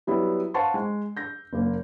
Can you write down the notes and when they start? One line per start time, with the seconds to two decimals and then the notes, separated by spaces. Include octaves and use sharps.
0.07 F#3 G3 B3 E4
0.54 C5 F5 F#5 A5 C6 C#6
0.74 G#3
1.16 G6 A#6
1.53 F#1 A#3